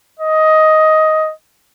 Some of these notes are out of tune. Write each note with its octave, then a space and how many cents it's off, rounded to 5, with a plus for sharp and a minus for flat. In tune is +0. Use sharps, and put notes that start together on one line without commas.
D#5 +10